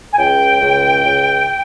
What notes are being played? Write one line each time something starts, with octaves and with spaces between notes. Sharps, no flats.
G#5
C#2 G5
C#2
C#2